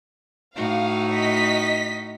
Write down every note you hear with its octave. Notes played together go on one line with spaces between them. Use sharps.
A2 D#4 F#4 F5
D#5 B6